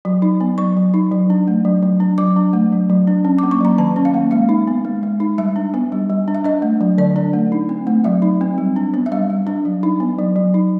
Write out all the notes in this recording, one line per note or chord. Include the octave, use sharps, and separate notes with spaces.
F#3
D#4
B3
F#3 C#6
F#3
D#4
F#3
D4
A3
F#3
F#3
D4
F#3 D6
D4
A3
F#3
F#3
D4
C#4
A#3 D6
C#6
F#3 A#5
D#3 A5
C#4
F5
A#3
G#3 F5
D#4
B3
G#3
G#3
D#4
G3 E5
D4
B3
G3
G3
D4
E5
D4 D#5
A3
F#3
D3 D5
D4
A3
D#4
C4
A3
F#3 E5
D#4
C4
G3
D4
B3
E5
G3 F5
G3
D4
F#3
D#4
B3
F#3
F#3
D#4